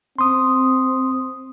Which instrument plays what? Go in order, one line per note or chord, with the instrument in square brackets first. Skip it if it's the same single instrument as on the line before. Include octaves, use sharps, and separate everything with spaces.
[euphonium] C4 [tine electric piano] C6 D#6